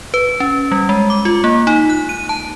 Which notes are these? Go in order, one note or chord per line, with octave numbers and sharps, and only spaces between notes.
B4
C#4
G3
G#3
D6
F4
A#3
D#4
F#6
D#7
A5